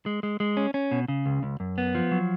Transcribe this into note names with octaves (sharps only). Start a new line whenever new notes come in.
G#3
G#3
G#3
C#4
C#4
B2
C#3
C#2
C#2
F#2
B3
F3
F#3